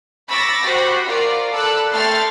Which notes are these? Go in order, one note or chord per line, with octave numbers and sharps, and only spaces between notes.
B5 C#6 D6 E6 A6 A#6
F#4 G4 C5 F#5 B5
F4 A#4 D5
A4 D5 B5 E6 F#6
A3 A4 G5 C6 F6 A6